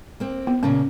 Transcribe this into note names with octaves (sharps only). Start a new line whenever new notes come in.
A#3 C4
B3
A#2 C#3 A#3 C#4